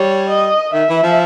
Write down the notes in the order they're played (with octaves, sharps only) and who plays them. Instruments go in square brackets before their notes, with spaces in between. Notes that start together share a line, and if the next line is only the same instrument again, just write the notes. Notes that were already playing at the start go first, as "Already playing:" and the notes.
Already playing: [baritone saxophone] G3 [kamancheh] C#5
[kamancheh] D#5
[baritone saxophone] D#3 [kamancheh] E5
[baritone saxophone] E3
F3